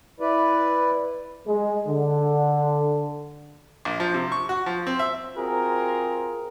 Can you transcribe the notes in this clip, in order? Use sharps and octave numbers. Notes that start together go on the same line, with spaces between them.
E4 B4 D5
G#3
D3
A#1
F3
C3
C#6
F#4
F3
C4
E5
C4 F4 F#4 G#4 A#4